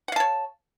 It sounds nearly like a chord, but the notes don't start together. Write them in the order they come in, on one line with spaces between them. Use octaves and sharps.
F#5 F5 A5 C#5